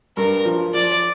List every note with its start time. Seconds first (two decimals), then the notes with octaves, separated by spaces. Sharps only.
0.17 G2 A#4
0.45 F3
0.74 F3 D5